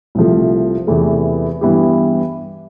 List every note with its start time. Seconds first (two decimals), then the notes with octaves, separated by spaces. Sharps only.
0.15 C2 C3 F3 A3
0.87 E2 C3 E3 A3
1.61 G2 E3 B3 E4 G4